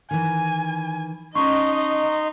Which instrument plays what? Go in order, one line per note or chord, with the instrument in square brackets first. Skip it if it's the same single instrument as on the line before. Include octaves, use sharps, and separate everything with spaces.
[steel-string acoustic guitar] D#3 E3 [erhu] G#5
[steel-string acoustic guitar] C#4 A5 [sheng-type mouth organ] D#4 C6 [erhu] D#5 [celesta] C#6